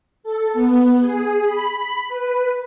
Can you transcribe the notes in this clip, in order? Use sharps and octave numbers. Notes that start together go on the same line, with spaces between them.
A4
B3
G#4
B5
B4